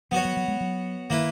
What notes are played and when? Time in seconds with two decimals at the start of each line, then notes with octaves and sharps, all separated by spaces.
0.11 F#3 B3 F#4 C#5
0.25 F#3
0.37 F#3
0.48 G#3
0.61 F#3
1.10 D#3 A#3 E4 B4